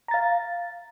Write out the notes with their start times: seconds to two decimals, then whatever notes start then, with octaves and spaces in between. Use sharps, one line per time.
0.08 A#5
0.11 A6
0.14 F5